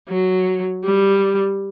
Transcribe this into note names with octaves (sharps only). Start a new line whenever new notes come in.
F#3
G3